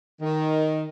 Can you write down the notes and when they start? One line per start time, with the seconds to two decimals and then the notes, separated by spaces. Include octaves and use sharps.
0.21 D#3